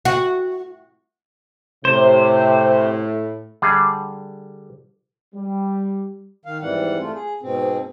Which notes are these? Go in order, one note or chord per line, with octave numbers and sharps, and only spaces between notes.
F#4
A2 C3 C5
D3 G3 G#4
G3
D#3 F5
F2 G#2 E3 G3 F#5
A3 F4
G#4
G#2 B2 C4